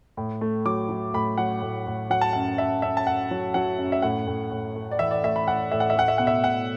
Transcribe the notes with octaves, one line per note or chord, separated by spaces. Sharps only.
A2
A3
F#3 D6
F#3
A2 B5
F#3 F#5
A2
A2
F#3 F#5
A5
F#2 F#5
F#2 E5
F#2 E5
A5
F#2 F#5
F#3
F#3 F#5
F#2
E5
A2 F#5
A2
A2
A3
D5
E3 E5
D5
A3 E5
B5
A2 F#5
A2 E5
F#5
E5
A3 F#5
E5
B2 F#5
E5
B2 F#5